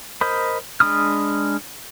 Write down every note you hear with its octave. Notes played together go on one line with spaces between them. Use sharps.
A#4 C5 D#5 B5
G#3 D4 B5 D#6 F6